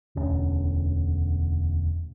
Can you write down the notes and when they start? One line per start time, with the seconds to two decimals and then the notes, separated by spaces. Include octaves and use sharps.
0.15 E1 D2 C#4